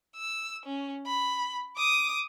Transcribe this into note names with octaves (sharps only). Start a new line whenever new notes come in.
E6
C#4
B5
D6 D#6